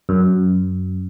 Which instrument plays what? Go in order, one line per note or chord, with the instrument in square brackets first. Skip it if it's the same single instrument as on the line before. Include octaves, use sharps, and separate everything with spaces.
[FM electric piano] F#2